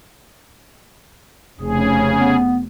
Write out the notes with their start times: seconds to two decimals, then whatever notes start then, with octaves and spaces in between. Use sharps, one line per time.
1.61 F1 C#3 G#4
2.18 B3